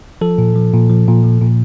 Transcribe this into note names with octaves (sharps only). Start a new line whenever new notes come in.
F3 A4
A#2
F3
A#2
F3
A#2
F3
A#2